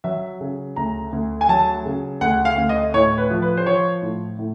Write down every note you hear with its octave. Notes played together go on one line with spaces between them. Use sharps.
F#3 E5
C#3
D2 A#5
D2
G#5
F#3 A5
C#3
D2 F#5
F5
D2
D#5
A2 C#5
B4
F3
B4
C5
F3 C#5
A2
A2